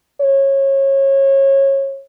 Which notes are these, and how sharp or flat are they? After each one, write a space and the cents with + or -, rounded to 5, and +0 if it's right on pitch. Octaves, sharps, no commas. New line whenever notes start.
C#5 -25